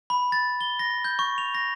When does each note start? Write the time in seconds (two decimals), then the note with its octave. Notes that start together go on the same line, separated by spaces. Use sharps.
0.10 B5
0.32 A6
0.61 G7
0.79 A#6
1.04 G6
1.19 C#6
1.38 F7
1.55 A#6